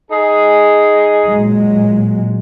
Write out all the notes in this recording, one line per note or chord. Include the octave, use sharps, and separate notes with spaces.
D#4 G#4
A#2 F#3 G#3